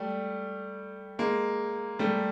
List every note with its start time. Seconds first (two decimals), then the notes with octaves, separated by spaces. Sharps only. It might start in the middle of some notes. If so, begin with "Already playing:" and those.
Already playing: G3 A3
1.19 G#3 A#3
1.99 G3 A3